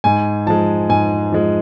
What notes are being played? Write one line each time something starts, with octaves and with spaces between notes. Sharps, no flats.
G#2 G#5
F3 G#3 A5
G#2 G#5
F3 G#3